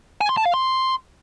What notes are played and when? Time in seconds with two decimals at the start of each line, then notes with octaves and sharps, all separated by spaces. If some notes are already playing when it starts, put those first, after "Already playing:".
0.21 G#5
0.29 C6
0.37 A5
0.45 F5
0.54 C6